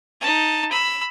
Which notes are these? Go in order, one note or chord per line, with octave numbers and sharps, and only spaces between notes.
D#4 A5
B5 E6